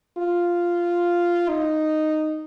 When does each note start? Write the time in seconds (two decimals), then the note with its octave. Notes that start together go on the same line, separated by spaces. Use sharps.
0.18 F4
1.49 D#4